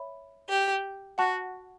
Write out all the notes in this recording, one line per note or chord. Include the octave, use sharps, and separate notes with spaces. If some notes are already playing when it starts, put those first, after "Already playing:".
Already playing: C#5 E5 B5
G4
F#4 F#5 A5 C#6 F#6